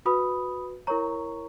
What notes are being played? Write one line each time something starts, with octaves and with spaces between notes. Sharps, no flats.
F#4 B4 B5 D#6
E4 A#4 C#5 A#5 C#6